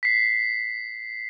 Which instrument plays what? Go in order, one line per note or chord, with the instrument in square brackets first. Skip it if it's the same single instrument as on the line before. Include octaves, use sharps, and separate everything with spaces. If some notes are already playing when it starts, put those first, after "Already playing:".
[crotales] B6 C7